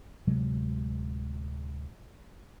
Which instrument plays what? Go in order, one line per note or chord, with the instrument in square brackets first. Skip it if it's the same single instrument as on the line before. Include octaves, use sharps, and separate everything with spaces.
[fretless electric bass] D1 C3 F#3 G#3